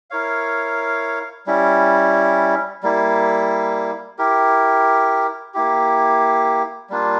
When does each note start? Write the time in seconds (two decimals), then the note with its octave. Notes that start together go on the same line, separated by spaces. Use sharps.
0.10 E4 A#4 C#5 F5
1.46 G3 C#4 E4
2.83 G3 A#3 E4
4.18 E4 G4 A#4
5.54 A#3 E4 G4
6.89 G3 A#3 D4 F4